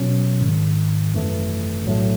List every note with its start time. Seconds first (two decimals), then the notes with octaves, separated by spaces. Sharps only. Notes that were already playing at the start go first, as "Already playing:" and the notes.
Already playing: B2 F#3 C#4
0.40 G#1 G#2 D#3
1.12 G#1 F#2 E3 A3
1.84 B1 A2 F#3 A3